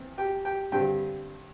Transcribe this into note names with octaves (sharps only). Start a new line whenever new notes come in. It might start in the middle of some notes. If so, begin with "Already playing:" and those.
Already playing: E2 C4
G4 G5
G4 G5
G2 D3 G3 C4 G4 G5